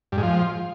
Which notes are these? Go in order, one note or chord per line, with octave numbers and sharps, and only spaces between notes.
G2
G#2
F3